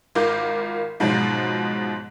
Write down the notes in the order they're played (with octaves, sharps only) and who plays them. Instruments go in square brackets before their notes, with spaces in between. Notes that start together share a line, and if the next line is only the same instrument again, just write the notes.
[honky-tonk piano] G#1 F4 A#4 D6 G6
G#2 B2 F3 F#3 G#3